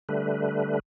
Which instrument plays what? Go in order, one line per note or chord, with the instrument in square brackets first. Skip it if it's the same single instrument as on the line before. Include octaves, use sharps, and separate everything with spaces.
[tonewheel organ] D3 G3 A3 B4